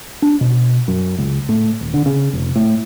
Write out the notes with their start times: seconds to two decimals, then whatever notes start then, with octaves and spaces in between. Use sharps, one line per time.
0.22 D4
0.41 B2
0.88 F#2
1.18 C#2
1.49 A2
1.81 D#1
1.94 D3
2.06 C#3
2.33 F1
2.56 A2